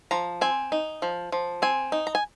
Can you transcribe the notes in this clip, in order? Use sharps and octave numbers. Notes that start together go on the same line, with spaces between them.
F3 A#5
C4 G#5
D#4
F3
F3
C4 G#5
D#4
A#5
G#5